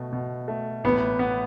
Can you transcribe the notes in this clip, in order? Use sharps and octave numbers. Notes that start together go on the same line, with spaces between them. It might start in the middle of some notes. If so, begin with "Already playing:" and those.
Already playing: B2 A3
B2
A3
A1 B3
B3